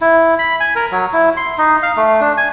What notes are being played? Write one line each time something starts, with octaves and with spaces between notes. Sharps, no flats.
E4
B5
G#5
A#4
F#3
E4
C6
D#4
F5
A3
D4
G#5